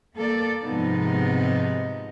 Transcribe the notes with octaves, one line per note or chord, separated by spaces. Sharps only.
A#3 A4 D5
G#2 C3 F3 B3 D#4